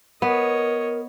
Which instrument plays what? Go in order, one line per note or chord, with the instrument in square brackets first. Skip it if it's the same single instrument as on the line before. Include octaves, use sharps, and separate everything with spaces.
[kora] B3 [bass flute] A#4 [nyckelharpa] C#5 D#5